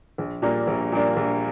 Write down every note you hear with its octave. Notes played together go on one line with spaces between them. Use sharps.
A#1
A#2 G3 A#3 D4
A#1
A#2 G3 A#3 D4
A#1